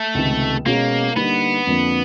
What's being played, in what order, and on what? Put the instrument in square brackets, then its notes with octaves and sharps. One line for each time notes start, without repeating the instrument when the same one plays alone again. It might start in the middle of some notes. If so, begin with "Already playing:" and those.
Already playing: [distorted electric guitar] A3
[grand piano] C#2 C3 D#3
[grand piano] B2 G#3 C#4 F#4 [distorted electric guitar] A#3
[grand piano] D3 G3 A#3 D#4 [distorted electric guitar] B3
[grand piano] F2 D3 F3 A#3